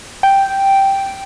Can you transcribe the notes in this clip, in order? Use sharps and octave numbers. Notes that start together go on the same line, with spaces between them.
G5